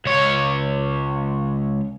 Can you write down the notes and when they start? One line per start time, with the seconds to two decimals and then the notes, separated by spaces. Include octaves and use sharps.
0.05 C#2 C#5